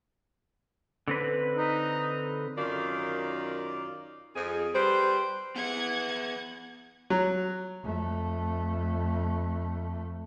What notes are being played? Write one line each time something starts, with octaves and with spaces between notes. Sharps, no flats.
D3 C4 B4
D#4
F#2 D#3 F4 A#4 D5
F2 G#4
G3 B4 C5
B3 G#4 B4 F#5 G#6
F#3
F2 A3